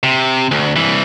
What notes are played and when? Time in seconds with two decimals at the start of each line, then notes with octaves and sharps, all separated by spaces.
0.03 C3
0.51 D2
0.76 C2 E3